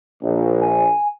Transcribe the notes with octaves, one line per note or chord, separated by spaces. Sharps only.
A#1
G#5